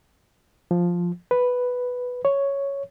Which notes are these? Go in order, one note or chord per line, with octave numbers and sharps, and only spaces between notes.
F3
B4
C#5